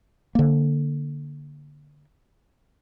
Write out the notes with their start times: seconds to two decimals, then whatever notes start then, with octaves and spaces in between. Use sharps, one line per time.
0.35 D3 A#3